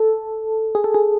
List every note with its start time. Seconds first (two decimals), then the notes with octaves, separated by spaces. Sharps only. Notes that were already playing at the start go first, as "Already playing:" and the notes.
Already playing: A4
0.75 G#4
0.84 A4
0.94 G#4